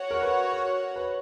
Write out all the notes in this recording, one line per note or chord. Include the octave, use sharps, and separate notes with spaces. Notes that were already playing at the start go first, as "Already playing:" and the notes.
Already playing: F#4 C#5 F#5
A#4
B4
A#4
B4